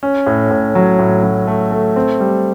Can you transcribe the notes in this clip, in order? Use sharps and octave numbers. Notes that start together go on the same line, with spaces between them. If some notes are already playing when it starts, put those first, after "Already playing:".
C#4
A2
A2
F#3
A2
F#3
A3
A3
C4
G3